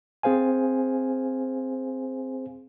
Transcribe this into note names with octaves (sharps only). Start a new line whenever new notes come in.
C4 G#4 C5 F5 G#5